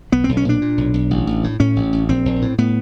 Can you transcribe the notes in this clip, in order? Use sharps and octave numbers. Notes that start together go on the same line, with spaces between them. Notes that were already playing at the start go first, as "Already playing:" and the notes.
B1 B3
B1 C4
C#4
A#2 D4
A#2
B1
B1
A1
A1
A2
A2 C#4
A1
A1
A#1 C4
A#1
A2
A2 B3